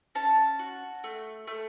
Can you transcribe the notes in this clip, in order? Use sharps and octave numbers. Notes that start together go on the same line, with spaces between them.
C#4 A5
F#4
A3
A3